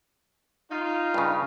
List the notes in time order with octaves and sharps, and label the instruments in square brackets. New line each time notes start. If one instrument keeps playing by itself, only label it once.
[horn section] D#4 F4
[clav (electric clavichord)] G2 C#3